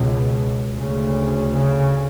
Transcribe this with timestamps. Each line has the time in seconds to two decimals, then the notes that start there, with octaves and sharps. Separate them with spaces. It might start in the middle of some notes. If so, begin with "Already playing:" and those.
Already playing: C#2 B2
0.71 D2 C#3
1.54 C#3